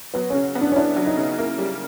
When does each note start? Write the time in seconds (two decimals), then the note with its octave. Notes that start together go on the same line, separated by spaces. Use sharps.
0.14 F#3 B3
0.30 C#3 C#4
0.55 B3
0.61 D4
0.72 C#4
0.76 D4 E4
0.96 F#3
1.07 D#4
1.17 C#3
1.38 A#3 E4
1.58 G3